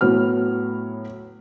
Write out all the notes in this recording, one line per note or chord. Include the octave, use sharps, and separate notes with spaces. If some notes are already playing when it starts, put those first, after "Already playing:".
A2 F#3 B3 F6